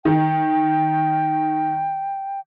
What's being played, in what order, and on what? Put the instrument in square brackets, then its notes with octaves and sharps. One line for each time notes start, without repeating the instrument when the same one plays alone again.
[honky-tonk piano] D#3 [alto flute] G5